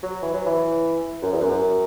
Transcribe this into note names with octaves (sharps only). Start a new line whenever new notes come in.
F#3
E3
F#3
E3
F#2
E2
F#2
F#2